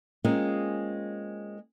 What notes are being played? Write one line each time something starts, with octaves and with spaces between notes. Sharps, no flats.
G#3 A#3 C4 C#4 F4 G#4